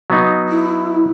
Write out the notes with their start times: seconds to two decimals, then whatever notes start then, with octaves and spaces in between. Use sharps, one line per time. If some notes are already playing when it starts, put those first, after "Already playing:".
0.10 F#3 B3 D#4
0.49 E4